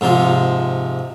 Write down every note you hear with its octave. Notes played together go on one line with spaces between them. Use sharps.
G#2 C3 F3